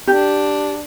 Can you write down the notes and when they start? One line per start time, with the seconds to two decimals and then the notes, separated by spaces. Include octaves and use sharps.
0.07 D4 G4